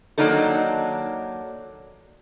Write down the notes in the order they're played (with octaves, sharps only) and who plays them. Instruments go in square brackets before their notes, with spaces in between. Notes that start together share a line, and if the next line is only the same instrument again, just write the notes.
[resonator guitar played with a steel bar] D#3 F#3 A#3 D4 D#4 A4